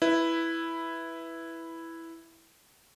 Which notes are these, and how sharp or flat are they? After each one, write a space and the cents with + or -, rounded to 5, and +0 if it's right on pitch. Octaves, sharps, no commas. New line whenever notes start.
E4 +0 B4 +0